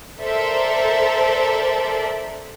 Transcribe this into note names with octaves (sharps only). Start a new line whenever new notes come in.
A4 A#4 C5 D5 E5